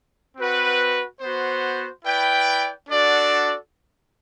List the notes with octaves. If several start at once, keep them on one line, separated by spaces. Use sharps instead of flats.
C4 F#4 B4 F#5
B3 F#4 C5
E4 B4 D5 G5
D4 F#4 A4 D5 F#5